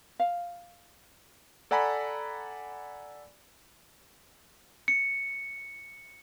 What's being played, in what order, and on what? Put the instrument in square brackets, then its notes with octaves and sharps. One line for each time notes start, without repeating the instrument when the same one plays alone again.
[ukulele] F5
[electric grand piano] A4 D5 F#5 G#5 A#5 B5
[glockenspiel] C#7